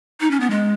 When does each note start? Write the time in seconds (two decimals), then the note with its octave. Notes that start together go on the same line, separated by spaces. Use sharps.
0.21 D#4
0.31 C#4
0.40 B3
0.50 G#3